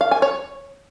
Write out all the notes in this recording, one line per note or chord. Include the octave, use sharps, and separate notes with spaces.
F5
G#5
C#5